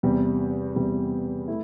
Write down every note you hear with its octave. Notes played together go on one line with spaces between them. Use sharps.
E2 C3 G3
E2 C3 G3
A3 E4